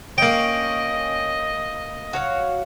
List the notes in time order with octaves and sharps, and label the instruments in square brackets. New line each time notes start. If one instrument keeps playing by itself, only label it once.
[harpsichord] A#3 G5 [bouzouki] C#4 [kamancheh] D#5
[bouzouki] F#4 C#5 F5